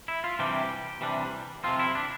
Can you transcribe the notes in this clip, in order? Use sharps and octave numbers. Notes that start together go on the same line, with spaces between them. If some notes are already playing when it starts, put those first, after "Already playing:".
E4
F4
C3 E3 G3 D4 G4
C3 E3 G3 D4
C3 F3 C4 F4
E4
D4